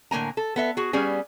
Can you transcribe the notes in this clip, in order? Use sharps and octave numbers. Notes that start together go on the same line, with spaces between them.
A2 D3 A#3 G#5 A#5
A4
B3 A4 E5
F#4 G#4
G3 B3 C#4 G#4